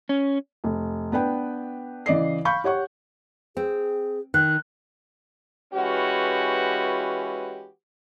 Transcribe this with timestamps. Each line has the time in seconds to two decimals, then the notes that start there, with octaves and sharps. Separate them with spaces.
0.09 C#4
0.64 F1
1.12 B3 D4 B4 G5
2.06 C#3 E3 D5 D#5 C7
2.45 F5 B5 C#6 G6
2.64 G4 C#5 F#5 C#6
3.57 C4 G#4
4.34 D#3 F#6
5.74 E3 G#3 C#4 F#4 G4 B4